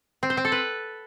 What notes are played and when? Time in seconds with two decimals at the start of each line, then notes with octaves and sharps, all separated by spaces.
0.23 C4
0.30 C5
0.37 C4
0.45 A4
0.52 B4